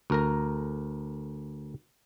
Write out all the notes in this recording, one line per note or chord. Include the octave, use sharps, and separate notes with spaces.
D2 A#4 A#5